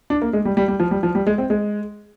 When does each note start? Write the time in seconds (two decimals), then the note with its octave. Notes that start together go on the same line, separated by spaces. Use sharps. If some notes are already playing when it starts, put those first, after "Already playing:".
0.10 D4
0.22 A#3
0.33 G#3
0.45 G3
0.57 G3
0.68 G3
0.80 F3
0.91 G3
1.03 F3
1.15 G3
1.27 G#3
1.38 C4
1.50 G#3